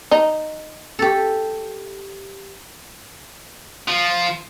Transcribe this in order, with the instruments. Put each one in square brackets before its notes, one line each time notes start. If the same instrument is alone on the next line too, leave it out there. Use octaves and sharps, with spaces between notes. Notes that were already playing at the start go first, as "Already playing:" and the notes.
[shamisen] D#4
[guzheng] G4 A4
[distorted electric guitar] F3 F4